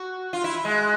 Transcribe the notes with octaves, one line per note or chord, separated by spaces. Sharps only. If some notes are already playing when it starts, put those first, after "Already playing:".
Already playing: F#4
F4
E4
G#3